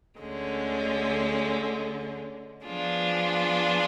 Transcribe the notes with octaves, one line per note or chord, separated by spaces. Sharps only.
D2 D3 G#3 C#4
F3 B3 D4 F4 G#4